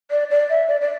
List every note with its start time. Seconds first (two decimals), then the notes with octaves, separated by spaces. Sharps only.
0.11 D5
0.31 D5
0.50 E5
0.68 D5
0.81 D5